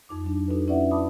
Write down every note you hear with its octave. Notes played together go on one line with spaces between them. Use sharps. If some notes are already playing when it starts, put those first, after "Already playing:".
F2 D#4 D6
F#3 D4
D4 D#4 F#4 A4 B4
C#4 E4 B4 D5 E5 F#5
A5 B5 D6 D#6